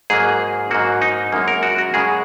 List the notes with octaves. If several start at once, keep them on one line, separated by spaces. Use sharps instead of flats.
G#2 F#3 A#3 G#4
G#2 F#3 A#3 F#4
D#4
F#2 C#3 G#3 A#3
A#4
F#4
F#4
F#2 C#3 G#3 G#4